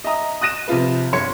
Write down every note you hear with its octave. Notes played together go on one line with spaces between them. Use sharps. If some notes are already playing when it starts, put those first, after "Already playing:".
D#5 E5 A#5 D#6
D#6 F#6 A#6 D#7 E7
C3 F3 F4 B4
G1 C#5 C6 C#7